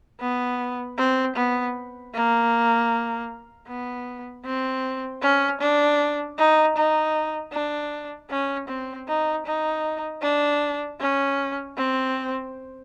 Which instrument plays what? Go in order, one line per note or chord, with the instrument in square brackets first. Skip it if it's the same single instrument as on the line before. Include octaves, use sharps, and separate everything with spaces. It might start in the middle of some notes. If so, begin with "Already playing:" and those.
[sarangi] B3
C4
B3
A#3
B3
C4
C#4
D4
D#4
D#4
D4
C#4
C4
D#4
D#4
D4
C#4
C4